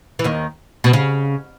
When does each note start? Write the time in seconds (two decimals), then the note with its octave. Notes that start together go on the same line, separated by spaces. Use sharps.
0.19 E3
0.24 D#2 D#3
0.84 B2
0.93 C#3